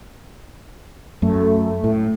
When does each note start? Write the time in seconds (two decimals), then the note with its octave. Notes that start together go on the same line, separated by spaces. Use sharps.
1.22 F#2 A3
1.84 A2